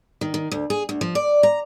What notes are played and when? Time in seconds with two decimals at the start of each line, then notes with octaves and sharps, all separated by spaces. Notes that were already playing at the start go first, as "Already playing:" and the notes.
0.21 D#3
0.34 D#3
0.52 D2
0.70 G#4
0.89 D2
1.01 F3
1.15 D5
1.43 A#5